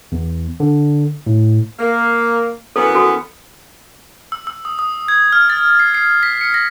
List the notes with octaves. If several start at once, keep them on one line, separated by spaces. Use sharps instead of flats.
E2
D3
A2
A#3
F#2 E3 B3 A4
F#4 A4
E6
E6
D#6
D#6
G#6
F6
A6
C7
C7
B6
C#7
A#6